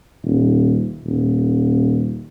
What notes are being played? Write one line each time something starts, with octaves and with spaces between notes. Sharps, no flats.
D#1
D#1